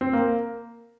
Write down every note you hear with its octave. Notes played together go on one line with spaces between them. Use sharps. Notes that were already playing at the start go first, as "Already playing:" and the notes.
C4
A#3